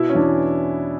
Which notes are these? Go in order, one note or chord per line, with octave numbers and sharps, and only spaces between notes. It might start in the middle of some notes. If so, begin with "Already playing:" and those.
Already playing: B2 E4
C#4
E2 D4